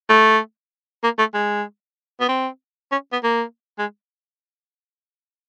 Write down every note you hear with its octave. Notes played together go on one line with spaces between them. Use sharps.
A3
A#3
A3
G#3
B3
C4
C#4
B3
A#3
G#3